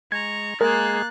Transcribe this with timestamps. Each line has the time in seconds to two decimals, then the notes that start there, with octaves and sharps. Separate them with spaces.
0.12 G#3 A#5 C#6 G#6
0.61 G#3 A#3 G#4 A#4 F#6 A6